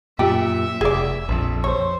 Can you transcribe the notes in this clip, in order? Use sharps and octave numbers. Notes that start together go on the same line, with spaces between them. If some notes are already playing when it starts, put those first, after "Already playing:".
F#2 A#2 G4 E5
F1 G#4 D5
A#1 F2
C5 C#5